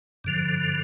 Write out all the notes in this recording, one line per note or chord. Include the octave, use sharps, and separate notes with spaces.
G2 D3 F3